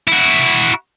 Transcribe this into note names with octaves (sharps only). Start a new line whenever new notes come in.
E4 F#4